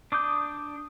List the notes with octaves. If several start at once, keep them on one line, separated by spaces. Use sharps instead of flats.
D4 D6 D#6 G6